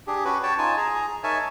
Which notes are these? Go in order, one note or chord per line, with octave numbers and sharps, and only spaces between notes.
D4 G4 G#4
C#4 F#4 B4
C#5 G5 A5
D#4 F4 G#5 A5
G#4 A#5
D#4 A#4 C#5 E5 G#5 A5